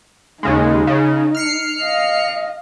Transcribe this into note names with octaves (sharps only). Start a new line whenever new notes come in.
D#2 C#3 G#3 D#4
C#3
F6 C7 C#7
D#5 F5